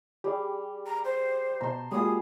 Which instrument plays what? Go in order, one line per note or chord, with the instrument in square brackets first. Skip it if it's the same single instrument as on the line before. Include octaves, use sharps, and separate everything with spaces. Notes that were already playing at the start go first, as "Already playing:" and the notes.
[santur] G3 [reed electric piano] G4 G#4 D5
[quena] A#5
C5
[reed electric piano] B2 A#5 [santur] A5 C6
[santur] G3 F4 G#4 [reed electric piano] G#3 A#3 F#4 [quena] D#6